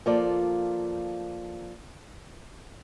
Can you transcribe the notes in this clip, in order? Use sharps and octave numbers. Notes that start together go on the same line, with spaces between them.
F3 A#3 F4 A4 D5